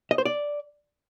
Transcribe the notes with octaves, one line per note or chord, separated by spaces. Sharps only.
D#5
C5
D5